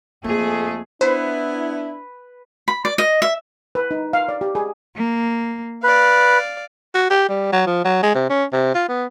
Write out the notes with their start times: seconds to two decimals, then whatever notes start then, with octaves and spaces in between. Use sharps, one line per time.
0.24 F2 A3 A#3 G#4
1.01 B3 D4 E4 B4 C5 B5
2.68 B5
2.85 D5
2.98 D#5
3.22 E5
3.75 B4
3.91 D#4
4.13 F5
4.29 D5
4.41 G4
4.55 G#4
4.94 A#3
5.84 B4 D5 F5
6.95 F#4
7.10 G4
7.29 G3
7.53 F#3
7.67 F3
7.85 F#3
8.02 G#3
8.15 C3
8.30 C#4
8.53 C3
8.75 F4
8.89 B3